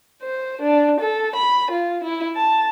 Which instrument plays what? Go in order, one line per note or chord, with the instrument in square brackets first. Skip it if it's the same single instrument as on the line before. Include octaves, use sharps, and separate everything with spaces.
[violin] C5
D4
A4
B5
F4
E4
A5